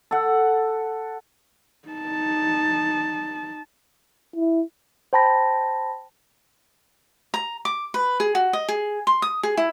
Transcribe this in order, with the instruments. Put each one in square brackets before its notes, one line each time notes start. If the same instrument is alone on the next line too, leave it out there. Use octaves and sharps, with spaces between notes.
[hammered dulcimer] A4 F#5
[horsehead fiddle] D#4 A5
[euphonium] E4
[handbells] C5 G5 A5 B5 A#6
[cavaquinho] A#5
D6
B4
G#4
F#4
D#5
G#4
C6
D#6
G#4
E4